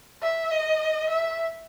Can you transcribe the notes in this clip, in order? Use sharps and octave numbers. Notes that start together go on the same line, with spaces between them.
E5
D#5
E5